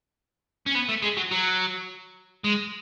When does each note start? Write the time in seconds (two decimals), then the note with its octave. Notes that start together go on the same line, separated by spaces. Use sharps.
0.66 C#4
0.75 B3
0.89 A3
1.02 G#3
1.17 F#3
1.31 F#3
2.44 G#3